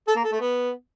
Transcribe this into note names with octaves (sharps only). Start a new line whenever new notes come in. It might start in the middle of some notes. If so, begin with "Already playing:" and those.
A4
A#3
A4
A3
B3